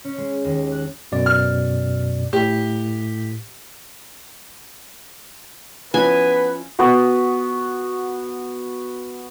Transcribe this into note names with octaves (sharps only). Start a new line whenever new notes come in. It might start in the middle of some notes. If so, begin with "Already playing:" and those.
C#4
G#3
D#2
F#6
F#2 B2 D5
F6
A2 G4
F3 B3 C#4 E4 B4 G#5
B3 F#4